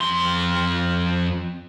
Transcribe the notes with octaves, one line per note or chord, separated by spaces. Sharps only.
F2 C6